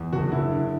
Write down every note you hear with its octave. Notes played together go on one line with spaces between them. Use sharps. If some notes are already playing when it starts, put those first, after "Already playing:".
Already playing: E2
F#1 F#4
F#1 E4
D3